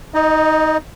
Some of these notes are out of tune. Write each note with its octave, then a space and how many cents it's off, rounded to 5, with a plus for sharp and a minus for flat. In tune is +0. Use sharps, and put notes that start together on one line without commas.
D#4 +15 D#5 -25